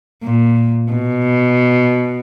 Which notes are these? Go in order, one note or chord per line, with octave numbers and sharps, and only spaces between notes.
A#2
B2